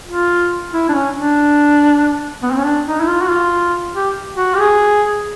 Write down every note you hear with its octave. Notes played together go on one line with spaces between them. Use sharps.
F4
E4
D4
C#4
D4
B3
C4
C#4
D4
D#4
E4
F4
F#4
F4
G4
F#4
G4
G#4